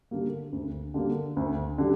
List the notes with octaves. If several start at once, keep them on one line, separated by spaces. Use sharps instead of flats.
D3 G3 A#3
D2
D3 G3 A#3
D2
D3 G3